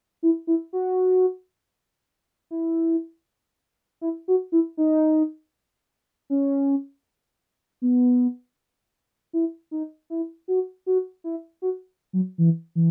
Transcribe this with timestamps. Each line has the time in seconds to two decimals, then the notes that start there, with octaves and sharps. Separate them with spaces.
0.23 E4
0.47 E4
0.73 F#4
2.51 E4
4.01 E4
4.28 F#4
4.52 E4
4.77 D#4
6.30 C#4
7.82 B3
9.33 E4
9.71 D#4
10.10 E4
10.48 F#4
10.86 F#4
11.24 E4
11.62 F#4
12.13 F#3
12.38 E3
12.75 E3